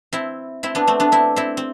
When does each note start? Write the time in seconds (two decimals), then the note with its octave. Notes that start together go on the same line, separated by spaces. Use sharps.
0.13 C4 E4
0.63 C4 E4
0.75 B3 D4
0.87 A3 C4
1.00 B3 D4
1.12 C4 E4
1.36 C4 E4
1.57 C4